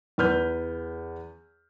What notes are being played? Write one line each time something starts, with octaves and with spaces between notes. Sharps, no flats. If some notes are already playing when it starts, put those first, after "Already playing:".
E2 B4 F6 G6